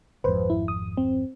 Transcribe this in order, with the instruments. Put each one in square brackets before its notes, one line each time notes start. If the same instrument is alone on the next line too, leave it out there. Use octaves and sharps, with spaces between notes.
[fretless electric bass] G#1 F2 [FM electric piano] B4 C5
[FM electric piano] E4
D#6
C4